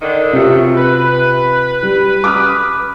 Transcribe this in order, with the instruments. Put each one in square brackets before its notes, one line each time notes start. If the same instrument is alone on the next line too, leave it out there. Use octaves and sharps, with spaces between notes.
[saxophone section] D3 D#3
[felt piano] C3 F4 [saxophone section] F3 F#3 A3
[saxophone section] B4
[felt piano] G3
D6 D#6 F6